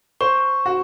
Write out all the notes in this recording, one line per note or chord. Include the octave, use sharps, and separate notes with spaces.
C5 C#6
F#4